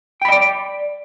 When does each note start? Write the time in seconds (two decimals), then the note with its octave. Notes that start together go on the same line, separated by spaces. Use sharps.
0.22 G5
0.25 B5
0.28 D#5
0.32 D5